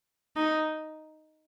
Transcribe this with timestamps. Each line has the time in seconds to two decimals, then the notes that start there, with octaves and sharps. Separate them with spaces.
0.37 D#4